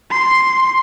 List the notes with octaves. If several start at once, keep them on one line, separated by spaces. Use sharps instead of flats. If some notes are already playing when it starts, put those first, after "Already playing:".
C6